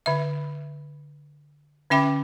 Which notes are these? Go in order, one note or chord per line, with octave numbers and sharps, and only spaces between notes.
D3 E5
D3 C#4 E5 G5 B5 D6